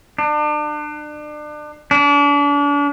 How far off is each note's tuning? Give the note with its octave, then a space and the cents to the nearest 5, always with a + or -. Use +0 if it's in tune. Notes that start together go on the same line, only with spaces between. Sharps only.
D4 +35
D4 -35